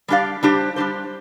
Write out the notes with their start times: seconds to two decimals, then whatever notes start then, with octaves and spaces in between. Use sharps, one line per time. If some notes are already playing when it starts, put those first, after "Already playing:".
0.08 G3 D4 G4 D5 F5
0.43 G3 D4 G4 C5
0.76 G3 D4 G4 C5